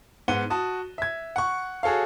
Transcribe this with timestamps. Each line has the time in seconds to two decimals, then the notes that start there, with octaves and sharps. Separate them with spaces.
0.28 G#2 B3 F#5 D#7 G7
0.50 F#4 A5 D#6
0.98 E5 G#6
1.36 F#5 C#6
1.83 F#4 G#4 A4 C#5 F5